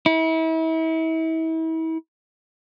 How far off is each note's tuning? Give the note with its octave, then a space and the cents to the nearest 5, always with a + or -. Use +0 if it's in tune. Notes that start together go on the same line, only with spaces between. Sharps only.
E4 -35